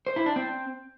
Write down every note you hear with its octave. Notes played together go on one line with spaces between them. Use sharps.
C5
E4
D4
C4